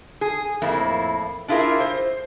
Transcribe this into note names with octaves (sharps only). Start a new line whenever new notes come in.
G#4
F2 A2 A#3 E4
D4 E4 F4 G#4 A#4 E5
C5